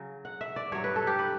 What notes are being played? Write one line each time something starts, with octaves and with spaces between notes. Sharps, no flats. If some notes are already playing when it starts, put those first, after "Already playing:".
Already playing: C#3 F#3
F#5
E5
D5
G2 F#3 C#5
B4
A4
G4
B4